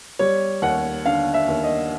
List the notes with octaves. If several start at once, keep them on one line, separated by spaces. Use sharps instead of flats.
G3 C#5
D#2 F#5
D3 F5
E5
D#2
D#5